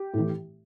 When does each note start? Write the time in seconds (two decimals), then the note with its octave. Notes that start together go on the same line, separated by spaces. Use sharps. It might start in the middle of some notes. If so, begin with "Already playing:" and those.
Already playing: G4
0.14 A2 E3